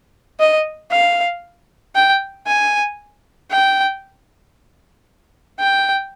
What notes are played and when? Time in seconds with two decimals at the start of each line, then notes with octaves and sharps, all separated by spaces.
0.40 D#5
0.92 F5
1.96 G5
2.47 G#5
3.51 G5
5.60 G5